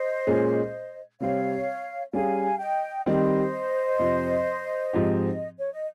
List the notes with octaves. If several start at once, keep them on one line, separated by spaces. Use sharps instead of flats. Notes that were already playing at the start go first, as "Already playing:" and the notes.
Already playing: C5 D#5
A#2 G#3 C#4 G#4
C3 G3 C4 C#5 F5
G3 C#4 G#4 F5 G#5
D#5 G5
D#3 G3 C4 C5 D#5
F2 C3 F3 C4
G#2 F3 C4 G4
C#5
D#5